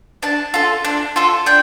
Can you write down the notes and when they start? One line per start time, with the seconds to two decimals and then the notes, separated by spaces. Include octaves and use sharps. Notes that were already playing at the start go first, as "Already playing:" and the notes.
0.23 D4 A5
0.54 F4 A4
0.85 D4
1.16 F4 A4
1.46 D4 G5